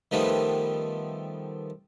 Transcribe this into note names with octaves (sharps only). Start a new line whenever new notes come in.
D#3 F3 G3 A3 B3